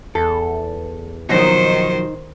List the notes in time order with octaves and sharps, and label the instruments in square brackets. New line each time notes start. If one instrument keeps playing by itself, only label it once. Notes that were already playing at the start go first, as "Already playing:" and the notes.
[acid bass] E2 [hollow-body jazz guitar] A4
[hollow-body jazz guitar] B2 F3 F#3 [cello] D#3 C5 [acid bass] D#4